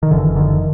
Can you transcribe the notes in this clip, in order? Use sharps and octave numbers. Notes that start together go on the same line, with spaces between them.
D#3
F#1 D3 E3
D3 D#3